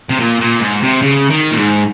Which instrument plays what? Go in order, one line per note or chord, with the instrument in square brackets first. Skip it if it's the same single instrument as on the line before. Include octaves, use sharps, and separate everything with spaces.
[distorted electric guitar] C3
A#2
A#2
G#2
C3
C#3
D#3
A#2
G#2